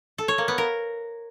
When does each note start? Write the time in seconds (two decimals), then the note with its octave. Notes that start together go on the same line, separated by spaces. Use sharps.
0.18 A4
0.28 C#5
0.38 A#3
0.48 B3
0.58 A#4